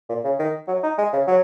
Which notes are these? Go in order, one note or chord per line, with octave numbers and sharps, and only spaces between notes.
A#2
C#3
D#3
F#3
D#4
G#3
C#3
F#3